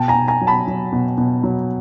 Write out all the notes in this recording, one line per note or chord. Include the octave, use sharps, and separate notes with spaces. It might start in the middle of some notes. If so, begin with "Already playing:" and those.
Already playing: B2 G5 A5
G#5 A#5
B2
G#5 A#5
F#3
A5 B5
F#3
B2
B2
F#3